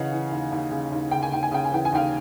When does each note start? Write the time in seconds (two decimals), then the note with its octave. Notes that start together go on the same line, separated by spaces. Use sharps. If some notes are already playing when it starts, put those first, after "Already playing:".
Already playing: C#3 E3 D#5 F5 F#5
0.12 E3
0.32 D#2
0.52 D#2
0.71 C#3
0.92 D#2
1.11 C#3 G5
1.23 G#5
1.32 D#2 G5
1.43 G#5
1.52 C#3 G5
1.65 G#5
1.72 E3 G5
1.85 G#5
1.92 D#2 F5 G5